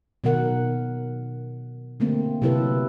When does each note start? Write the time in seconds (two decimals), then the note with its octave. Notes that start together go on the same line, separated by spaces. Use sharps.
0.24 B2 D#3 F#3 A#4 F#5
2.00 D3 A3 A#3 C4
2.42 C3 F#3 E4 A4 B4